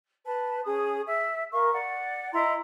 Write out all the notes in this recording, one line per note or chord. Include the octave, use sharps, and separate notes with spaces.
B4 A5
C#4 G#4 D#6
E5
A#4 F5 C#6
D5 F#5
E4 D#5 A#5 C6